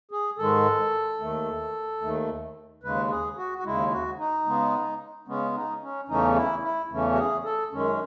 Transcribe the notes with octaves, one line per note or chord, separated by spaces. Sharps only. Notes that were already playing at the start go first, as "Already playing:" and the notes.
G#4
G#2 D#3 G#3 A4
D#2 D#3 A3
D#2 D#3 A3
D#2 C#3 G#3 B4
G#4
F#4
F#4
D#2 C#3 G#3 E4
F#4
D#4
C#3 G#3 B3
C#3 G#3 B3 C#4
D#4
C#4
E2 C#3 E3 A3 C#4 D#4
E4
E4
E2 C#3 E3 A3 C#4
F#4
G#4
A4
F#2 D#3 G#3 C#4